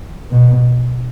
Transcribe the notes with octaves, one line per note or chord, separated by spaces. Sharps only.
B2